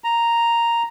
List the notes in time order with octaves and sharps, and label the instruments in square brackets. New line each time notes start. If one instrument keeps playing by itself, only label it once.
[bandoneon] A#5